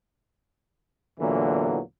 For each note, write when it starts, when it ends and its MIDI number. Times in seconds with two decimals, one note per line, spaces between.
1.20 1.80 40
1.20 1.80 46
1.20 1.80 50
1.20 1.80 52
1.20 1.80 54
1.20 1.80 58